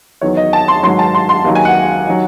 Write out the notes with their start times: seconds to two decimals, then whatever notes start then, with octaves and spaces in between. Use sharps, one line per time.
0.21 E2 D#3 F#3 C#5
0.37 D#5
0.53 A5
0.68 C6
0.83 G#2 D#3 F#3 C6
0.99 A5
1.15 C6
1.29 C6
1.44 D#2 D#3 F#3
1.55 G#5
1.65 F#5
2.08 D#3 F#3